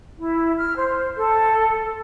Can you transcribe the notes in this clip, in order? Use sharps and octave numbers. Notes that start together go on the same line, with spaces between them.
E4
F6
C5
A4